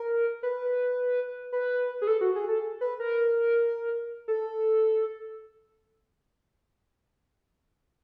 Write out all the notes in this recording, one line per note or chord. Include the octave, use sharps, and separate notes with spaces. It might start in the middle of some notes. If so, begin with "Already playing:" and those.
Already playing: A#4
B4
B4
G#4
A4
F#4
G#4
A4
B4
A#4
A4